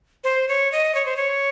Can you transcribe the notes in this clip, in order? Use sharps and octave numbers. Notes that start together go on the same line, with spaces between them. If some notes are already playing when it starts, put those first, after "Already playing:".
C5
C#5
D#5
C#5
C5
C#5